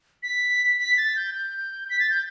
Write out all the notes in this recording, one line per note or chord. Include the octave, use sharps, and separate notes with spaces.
B6
B6
A6
G6
G6
B6
A6
G6